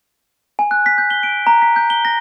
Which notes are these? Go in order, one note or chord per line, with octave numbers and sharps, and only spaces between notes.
G#5
F#6
B6
G6
G7
D7
A#5
B6
G6
G7
A#6